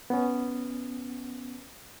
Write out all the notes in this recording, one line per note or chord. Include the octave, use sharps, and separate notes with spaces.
B3 C#4